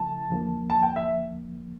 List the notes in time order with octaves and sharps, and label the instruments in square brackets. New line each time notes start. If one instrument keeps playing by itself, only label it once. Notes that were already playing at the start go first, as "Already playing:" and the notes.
Already playing: [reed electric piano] C#3 F3 A3 E4 [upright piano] A5
[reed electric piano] E2 D3 F3 A#3
[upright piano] A5
G5
E5